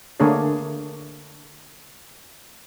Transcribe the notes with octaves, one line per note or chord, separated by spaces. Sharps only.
D3 A3 A#3 D4 G#4 C#5